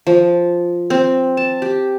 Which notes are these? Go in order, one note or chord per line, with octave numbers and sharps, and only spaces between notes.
F3
C4
A5
G4